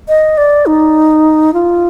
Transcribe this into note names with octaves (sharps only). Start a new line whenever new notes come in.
D#5
D5
D#4
F4